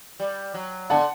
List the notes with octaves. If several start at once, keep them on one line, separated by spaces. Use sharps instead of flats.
G3
F#3
D3 F#5 A5